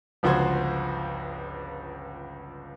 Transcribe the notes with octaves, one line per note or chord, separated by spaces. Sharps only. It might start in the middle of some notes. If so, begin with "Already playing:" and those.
G1 C#2 F3 F#4 C5 G#6